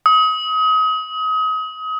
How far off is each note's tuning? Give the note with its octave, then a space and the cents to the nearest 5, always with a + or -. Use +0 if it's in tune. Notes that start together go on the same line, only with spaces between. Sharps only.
D#6 +30